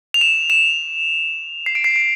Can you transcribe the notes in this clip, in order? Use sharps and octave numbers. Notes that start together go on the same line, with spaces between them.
F7
E7
E7
C7
D7
C7
D7